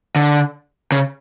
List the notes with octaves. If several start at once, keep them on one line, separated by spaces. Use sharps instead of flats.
D3
C#3